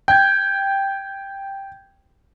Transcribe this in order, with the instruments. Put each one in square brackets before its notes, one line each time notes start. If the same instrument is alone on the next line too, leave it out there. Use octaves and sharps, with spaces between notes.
[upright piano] G5 [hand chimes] G6 G#6